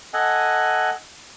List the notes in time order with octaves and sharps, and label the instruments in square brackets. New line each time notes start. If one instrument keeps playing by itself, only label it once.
[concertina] A4 D#5 F#5 G#5